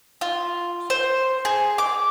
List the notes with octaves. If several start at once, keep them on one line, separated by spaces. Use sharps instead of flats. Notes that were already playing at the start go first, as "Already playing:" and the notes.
F4
C5
G#4
D6